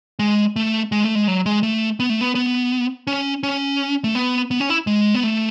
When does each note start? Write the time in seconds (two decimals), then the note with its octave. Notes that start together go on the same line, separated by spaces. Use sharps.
0.19 G#3
0.56 A3
0.92 G#3
1.04 A3
1.15 G#3
1.28 F#3
1.46 G#3
1.63 A3
2.00 B3
2.10 A3
2.21 B3
2.35 B3
3.07 C#4
3.43 C#4
4.04 A3
4.15 B3
4.51 B3
4.60 C#4
4.70 E4
4.87 G#3
5.14 B3
5.24 A3